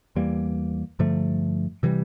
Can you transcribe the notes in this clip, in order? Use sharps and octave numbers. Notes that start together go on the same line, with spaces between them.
E2 E3 G3 A#3
G2 D3 F3 A3
C3 E3 G3